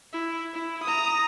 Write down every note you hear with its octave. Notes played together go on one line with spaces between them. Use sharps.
E4
E4
A#5 D#6